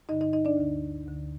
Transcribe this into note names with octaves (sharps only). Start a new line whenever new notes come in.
G2 D3 D#4 D#5
D#4 D#5
D#4 D#5
D4 D5
D2 D3
D2 D3